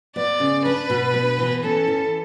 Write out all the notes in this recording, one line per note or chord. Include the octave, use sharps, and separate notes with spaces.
B3 D5
C#3
D4 B4
B2
B3
E3
C#4 A4
E3